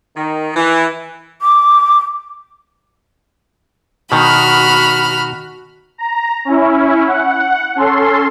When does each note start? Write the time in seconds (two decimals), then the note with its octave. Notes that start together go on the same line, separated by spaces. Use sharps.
0.16 D#3
0.55 E3
1.42 D6
4.12 B2 D#3 F#4 B5 F6
5.98 A#5
6.45 C#4 E4
7.07 F#5
7.76 C#4 A4 C6